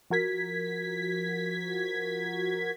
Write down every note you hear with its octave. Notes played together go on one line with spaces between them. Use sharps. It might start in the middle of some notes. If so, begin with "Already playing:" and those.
F3 F#4 A#4 G#6 B6